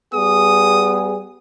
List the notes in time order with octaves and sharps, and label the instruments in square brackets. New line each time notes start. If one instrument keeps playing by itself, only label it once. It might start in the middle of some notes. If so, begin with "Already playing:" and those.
[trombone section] G3 B3 G#4 [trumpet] D#6